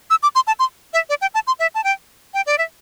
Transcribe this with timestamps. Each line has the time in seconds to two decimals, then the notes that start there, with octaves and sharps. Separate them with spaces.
0.10 E6
0.23 D6
0.35 C6
0.47 A5
0.59 C6
0.93 E5
1.09 D5
1.22 G5
1.34 A5
1.47 C6
1.59 E5
1.75 A5
1.84 G5
2.34 G5
2.46 D5
2.58 E5